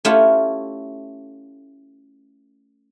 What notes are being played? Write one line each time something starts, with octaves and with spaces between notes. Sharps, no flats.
A3 C#4 E4 F4 G4